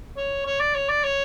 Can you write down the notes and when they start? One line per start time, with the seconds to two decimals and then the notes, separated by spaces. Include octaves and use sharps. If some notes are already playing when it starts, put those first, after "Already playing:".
0.17 C#5
0.46 C#5
0.60 D5
0.75 C#5
0.89 D5
1.04 C#5